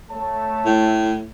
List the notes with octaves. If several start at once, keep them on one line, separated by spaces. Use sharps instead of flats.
A3 C#5 A5
A2